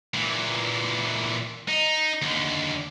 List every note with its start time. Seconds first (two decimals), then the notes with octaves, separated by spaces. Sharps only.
0.14 A#2 E3
1.68 D#4
2.22 D#2 D3